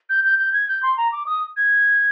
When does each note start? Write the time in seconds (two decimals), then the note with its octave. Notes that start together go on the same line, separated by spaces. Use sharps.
0.09 G6
0.24 G6
0.38 G6
0.53 G#6
0.68 G6
0.83 C6
0.97 A#5
1.12 D6
1.26 D#6
1.56 G#6